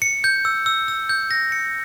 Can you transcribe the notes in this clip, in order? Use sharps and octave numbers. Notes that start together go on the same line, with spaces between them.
C#7
G6
E6
E6
E6
G6
A#6
C#7